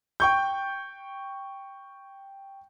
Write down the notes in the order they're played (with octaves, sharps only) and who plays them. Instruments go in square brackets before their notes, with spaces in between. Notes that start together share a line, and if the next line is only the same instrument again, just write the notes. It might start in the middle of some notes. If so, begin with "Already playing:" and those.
[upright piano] G5 C#6 G6